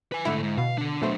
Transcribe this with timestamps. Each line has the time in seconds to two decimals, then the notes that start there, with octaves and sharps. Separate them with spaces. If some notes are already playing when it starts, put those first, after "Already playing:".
0.12 B4 G#5
0.25 G#2 D3 A3 E4
0.43 G#2
0.58 B2 F5
0.78 D3 D4
1.02 B2 F#3 A3 D4 C5